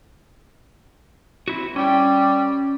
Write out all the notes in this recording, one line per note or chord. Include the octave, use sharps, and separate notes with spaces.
C4 E4 F#4
G3 C#4 G5